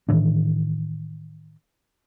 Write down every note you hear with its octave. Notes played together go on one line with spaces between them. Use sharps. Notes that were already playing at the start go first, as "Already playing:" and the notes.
A2 D#3 E3 D4